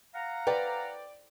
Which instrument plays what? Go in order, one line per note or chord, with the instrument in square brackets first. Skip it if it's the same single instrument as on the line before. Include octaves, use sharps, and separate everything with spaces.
[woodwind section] F5 F#5 A#5
[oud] B4 [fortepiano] D5 G5